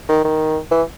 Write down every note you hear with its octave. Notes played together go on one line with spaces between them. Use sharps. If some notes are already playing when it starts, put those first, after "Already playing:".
D#3
D#3
E3